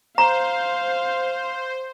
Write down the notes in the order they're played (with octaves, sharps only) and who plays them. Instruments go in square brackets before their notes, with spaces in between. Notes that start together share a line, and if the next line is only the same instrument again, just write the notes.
[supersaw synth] C5 [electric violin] F5 [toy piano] A#5